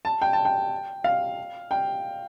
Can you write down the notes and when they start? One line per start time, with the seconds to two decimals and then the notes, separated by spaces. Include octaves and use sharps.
0.05 A5
0.22 G5
0.33 A5
0.45 G5
1.04 F5
1.71 G5